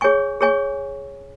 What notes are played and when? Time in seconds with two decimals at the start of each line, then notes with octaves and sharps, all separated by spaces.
0.01 G#4 C#5 G#5 C#6
0.41 G#4 C#5 G#5 C#6